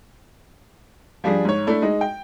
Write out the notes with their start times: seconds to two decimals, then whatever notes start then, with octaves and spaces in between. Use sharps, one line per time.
1.24 F3 G3 D4 G#4
1.45 G#2 C#5
1.67 A3 D4 E4
1.82 G#3 D#4
2.01 G5